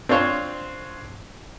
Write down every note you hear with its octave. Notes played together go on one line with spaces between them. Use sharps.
C4 D4 F4 C5 C#5